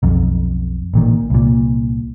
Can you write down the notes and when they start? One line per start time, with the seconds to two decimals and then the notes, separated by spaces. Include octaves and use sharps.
0.03 B1 F2
0.94 A1 A#2 D#3
1.30 C2 A#2